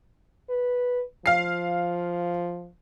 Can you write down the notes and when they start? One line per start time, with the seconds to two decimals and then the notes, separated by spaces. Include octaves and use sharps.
0.49 B4
1.26 F3 F5 C7